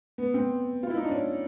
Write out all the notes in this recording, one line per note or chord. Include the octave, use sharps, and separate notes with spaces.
B3
C4
F4
E4
D#4
D4
C#4